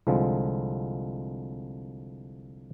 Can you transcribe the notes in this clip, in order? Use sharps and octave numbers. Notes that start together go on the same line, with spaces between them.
C2 D3 F3 G#3